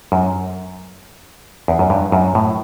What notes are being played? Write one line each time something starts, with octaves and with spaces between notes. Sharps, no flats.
F#2
E2
F#2
G2
F#2
A2